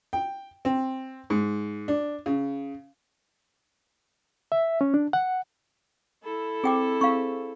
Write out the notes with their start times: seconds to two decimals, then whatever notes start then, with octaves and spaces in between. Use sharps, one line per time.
0.13 G5
0.65 C4
1.30 G#2
1.88 D4
2.26 C#3
4.52 E5
4.81 C#4
4.94 D4
5.13 F#5
6.23 E4 A4
6.64 C4 G#4 G5 D6
7.01 C4 G#4 F5 C#6